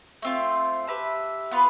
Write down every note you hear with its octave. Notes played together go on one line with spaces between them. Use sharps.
A3 C4 F4
G4 B4 E5 A5
B3 F4 B4